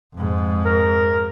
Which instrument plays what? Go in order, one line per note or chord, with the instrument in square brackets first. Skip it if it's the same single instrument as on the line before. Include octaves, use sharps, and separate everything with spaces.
[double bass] F2 G#2
[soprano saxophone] A#4